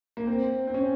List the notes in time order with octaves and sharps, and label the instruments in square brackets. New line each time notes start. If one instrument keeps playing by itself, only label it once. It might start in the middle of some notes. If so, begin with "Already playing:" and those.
[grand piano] A#3
C4
C4
C#4